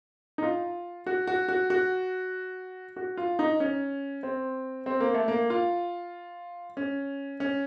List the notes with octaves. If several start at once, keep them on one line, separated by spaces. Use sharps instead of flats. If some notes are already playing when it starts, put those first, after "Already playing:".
D#4
F4
F#4
F#4
F#4
F#4
F#4
F4
D#4
C#4
C4
C4
A#3
A3
A#3
F4
C#4
C#4